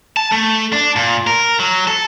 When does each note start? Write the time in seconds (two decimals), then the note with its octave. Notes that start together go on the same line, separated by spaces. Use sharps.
0.17 A5
0.32 A3
0.73 D4
0.96 A#2
1.27 A#4
1.60 F#3
1.88 A4